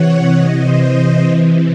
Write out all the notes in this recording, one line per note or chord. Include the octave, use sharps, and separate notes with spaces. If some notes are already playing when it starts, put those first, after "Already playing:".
Already playing: C3 E3 C#5 F#5
C3 E3 D#5
C5
D#5
C3 E3